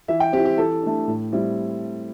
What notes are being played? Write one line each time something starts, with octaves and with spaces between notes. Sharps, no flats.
E3 E5
G5
C4 E4 G4
G4
E3 A4
A3 D4
A2
G3 C4 E4